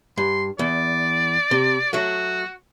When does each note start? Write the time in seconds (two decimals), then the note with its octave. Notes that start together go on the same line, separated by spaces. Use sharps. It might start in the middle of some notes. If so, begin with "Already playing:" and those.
0.18 G2 C6
0.59 E2 D5
1.51 C3
1.93 F#3 A3 F#4